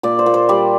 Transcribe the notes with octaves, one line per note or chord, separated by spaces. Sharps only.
A#2 D5
C5
A#2
C5
G3 D5